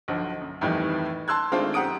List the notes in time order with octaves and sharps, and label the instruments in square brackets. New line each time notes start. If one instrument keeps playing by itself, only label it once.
[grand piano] B1 D3 F3
F#2
F2 A2 D#3 E3 G3
A5 C6 E6 F#6 G#6
D#3 G#3 A3 C4 D4 F4
F#2 G4 F#5 A#5 D#6 D7